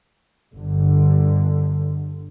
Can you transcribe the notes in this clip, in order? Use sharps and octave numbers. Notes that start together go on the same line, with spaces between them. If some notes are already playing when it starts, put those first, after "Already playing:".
G1 D3